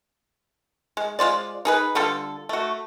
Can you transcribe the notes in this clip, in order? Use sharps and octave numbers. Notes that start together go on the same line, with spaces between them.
G#3
G#3 F4 C5 D5
D#4 G#4 B4
D3 G3 F4 A4
A3 F#4